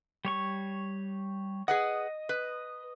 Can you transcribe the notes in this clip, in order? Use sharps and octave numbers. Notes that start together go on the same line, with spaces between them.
G3 C#5 C#6
G#4 B4 D#5 F#5
B4